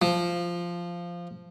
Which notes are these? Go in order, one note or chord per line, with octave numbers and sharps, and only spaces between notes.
F3